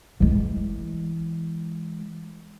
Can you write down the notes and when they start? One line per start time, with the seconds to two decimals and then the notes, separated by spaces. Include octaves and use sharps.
0.20 E3 G#3